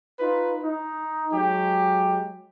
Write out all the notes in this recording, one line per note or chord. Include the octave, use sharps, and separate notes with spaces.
D#4 F4 B4
D#4
F#3 G#3 G4